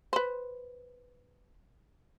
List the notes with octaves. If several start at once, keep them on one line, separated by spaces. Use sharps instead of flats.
B4 C5